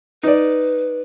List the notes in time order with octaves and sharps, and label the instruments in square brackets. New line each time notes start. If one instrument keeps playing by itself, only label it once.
[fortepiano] D#4 D5 [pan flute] B4